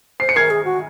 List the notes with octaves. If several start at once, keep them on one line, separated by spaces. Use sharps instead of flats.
C5 C7
C#7
A#4 G#6 C7
G#4
F#4